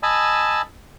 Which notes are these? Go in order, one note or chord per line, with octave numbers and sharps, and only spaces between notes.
D#5 G#5 A5 B5 E6